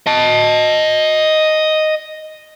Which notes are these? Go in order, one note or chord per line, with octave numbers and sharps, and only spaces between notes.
D#5 A5